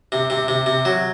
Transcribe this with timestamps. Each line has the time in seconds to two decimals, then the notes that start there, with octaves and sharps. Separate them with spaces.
0.12 C3
0.30 C3
0.48 C3
0.66 C3
0.85 F#3